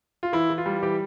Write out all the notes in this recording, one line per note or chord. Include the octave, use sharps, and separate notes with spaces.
F4
E3 E4
E3
F4
G3
E3 G4